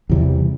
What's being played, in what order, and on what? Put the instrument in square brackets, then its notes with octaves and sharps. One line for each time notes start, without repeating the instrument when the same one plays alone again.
[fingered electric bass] E2 C3 E3 G3